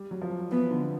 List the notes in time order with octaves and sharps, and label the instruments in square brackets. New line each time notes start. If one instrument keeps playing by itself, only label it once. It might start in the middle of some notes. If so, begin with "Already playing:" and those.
Already playing: [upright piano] G3
F#3
F3
[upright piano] E3 [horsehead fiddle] B3
[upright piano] D3